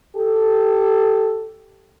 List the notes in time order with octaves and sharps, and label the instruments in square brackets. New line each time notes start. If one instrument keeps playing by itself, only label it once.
[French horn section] G4 A4